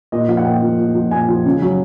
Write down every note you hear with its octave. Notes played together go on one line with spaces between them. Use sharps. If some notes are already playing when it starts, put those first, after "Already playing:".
A#2 D#5
F3 F5
F#5
A#2 G5
F3
A#2
F3
A#2 G#5
F3
C#3
F#3